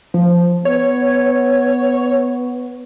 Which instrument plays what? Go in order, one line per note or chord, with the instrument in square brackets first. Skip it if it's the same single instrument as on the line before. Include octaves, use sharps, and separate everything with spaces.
[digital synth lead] F3
[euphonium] B3 [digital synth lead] C#5